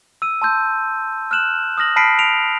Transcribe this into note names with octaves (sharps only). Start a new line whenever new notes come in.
E6 D#7
A5 C6 E6 G6
F6 F#6 E7 F#7
D#6 F6 A#6 F#7
A5 B5 F6 B6 C7 D7
D7 F7